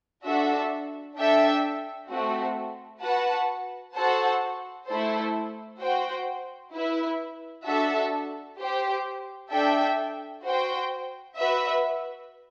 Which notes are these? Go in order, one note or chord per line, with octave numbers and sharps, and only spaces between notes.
D4 F#4 A4 E5
D4 A4 E5 G5
A3 C4 F#4
F#4 B4 F#5 A5
F#4 A4 C5 F#5 A5
A3 E4 A4 C5
F#4 C5 G5
E4 B4 E5
D4 F#4 A4 E5 A5
G4 C5 G5
D4 A4 E5 G5
F#4 C5 G5
F#4 B4 E5